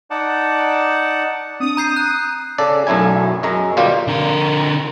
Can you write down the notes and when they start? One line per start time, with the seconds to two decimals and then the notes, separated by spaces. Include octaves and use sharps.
0.10 D#4 D5 F#5 A5
1.60 C4 D4 D#6
1.77 A#5 G6 C7
1.96 F#6
2.58 C#3 A4 D5
2.87 B1 F#2 A3 E4 G#5
3.43 F#2 G#3 A#5
3.77 G1 B2 G3 A#3 F4 G4
4.08 D3 A#4